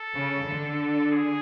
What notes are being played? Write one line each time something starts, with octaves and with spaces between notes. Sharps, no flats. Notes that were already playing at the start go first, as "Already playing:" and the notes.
Already playing: A4
C#3
D3
G#4